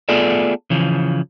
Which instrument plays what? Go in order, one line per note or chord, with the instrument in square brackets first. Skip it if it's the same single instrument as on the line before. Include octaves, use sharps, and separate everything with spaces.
[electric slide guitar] A3 B3 F4 G#4 A4 D5
C#3 E3 F3